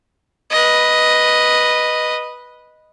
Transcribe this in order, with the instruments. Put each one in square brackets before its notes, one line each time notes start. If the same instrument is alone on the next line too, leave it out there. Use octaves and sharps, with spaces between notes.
[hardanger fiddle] B4 D#5